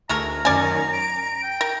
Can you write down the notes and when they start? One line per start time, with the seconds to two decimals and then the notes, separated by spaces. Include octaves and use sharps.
0.09 D2 G#3 A3 A#4 A#5
0.45 F#2 D#3 C#4 D5 G#5
0.93 D7
1.43 G5
1.61 A#4